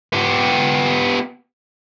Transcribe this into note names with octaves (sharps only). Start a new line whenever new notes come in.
B3 G4